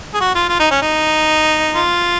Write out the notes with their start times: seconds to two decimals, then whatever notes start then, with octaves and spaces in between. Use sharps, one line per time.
0.14 G#4
0.21 F#4
0.35 F4
0.49 F4
0.60 D#4
0.71 C#4
0.82 D#4
1.75 F4